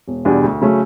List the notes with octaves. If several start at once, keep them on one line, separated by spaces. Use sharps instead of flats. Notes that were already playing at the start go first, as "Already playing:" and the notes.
E1
E2 B2 G3 D4
D2
C#3 F#3 A3 C#4